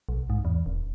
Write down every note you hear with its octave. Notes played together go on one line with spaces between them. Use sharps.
B1
G#2
E2
D#1